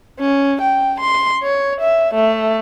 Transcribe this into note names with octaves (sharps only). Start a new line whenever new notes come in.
C#4
G5
C6
C#5
E5
A3